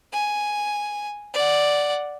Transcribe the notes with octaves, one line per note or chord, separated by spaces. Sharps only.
G#5
D5 F#5